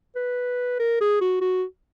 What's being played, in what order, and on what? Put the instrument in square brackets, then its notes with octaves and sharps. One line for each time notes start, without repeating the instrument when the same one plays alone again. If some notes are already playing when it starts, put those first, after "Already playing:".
[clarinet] B4
A#4
G#4
F#4
F#4